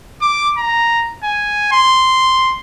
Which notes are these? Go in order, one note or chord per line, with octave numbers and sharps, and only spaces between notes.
D6
A#5
G#5
C6